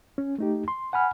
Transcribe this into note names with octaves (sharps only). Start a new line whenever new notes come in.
C#4
A3 D#4 G4
C6
F#5 G#5 B5 F6